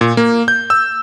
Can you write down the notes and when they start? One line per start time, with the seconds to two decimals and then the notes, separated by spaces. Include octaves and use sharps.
0.01 A#2
0.17 A#3
0.48 G6
0.70 E6